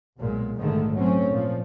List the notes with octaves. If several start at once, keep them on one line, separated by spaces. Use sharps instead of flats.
B1 A#2 G#3
A#1 G#2 D3 D#3 G#3 A3
F#3 A3 C4 C#4
A#2 F3